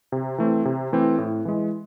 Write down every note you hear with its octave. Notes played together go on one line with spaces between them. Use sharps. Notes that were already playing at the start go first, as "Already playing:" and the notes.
C3
E3 A3 C4
C3
E3 A3 C4
A2
E3 G#3